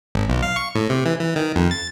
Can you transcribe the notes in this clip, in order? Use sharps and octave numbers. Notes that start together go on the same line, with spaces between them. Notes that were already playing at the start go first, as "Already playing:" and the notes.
G#1
B1
F5
C#6
A2
C3
E3
E3
D#3
F2
A6